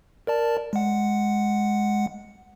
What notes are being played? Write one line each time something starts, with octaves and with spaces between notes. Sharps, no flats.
A#4 D5 A5
G#3 F#5